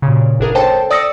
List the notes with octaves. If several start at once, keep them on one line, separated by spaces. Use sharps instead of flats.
A#2 C#3
G#1 D4 G#4 A#4
A4 C5 C#5 G5 A5
D5 D#6 E6 A#6 C#7